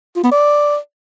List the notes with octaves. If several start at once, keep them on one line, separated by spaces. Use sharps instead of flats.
F4
B3
D5